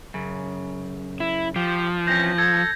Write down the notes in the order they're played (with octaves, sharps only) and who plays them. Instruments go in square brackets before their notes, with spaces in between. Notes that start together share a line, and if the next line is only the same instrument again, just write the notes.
[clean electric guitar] F#2 C#3
[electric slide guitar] E4
[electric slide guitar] F3 [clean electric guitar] G4
[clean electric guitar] E3 C4 C#4 [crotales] G6 A#6
[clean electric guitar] A4 [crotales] G#6